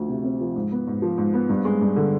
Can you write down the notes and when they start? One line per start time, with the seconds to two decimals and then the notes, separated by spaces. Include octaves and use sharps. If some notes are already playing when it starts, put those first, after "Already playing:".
Already playing: D2 F3
0.09 C3
0.24 C4
0.40 F3
0.56 G#2
0.72 B3
0.87 G#2
1.02 F3
1.18 G#2
1.33 B3
1.49 G2
1.65 G#3
1.81 G2
1.96 D3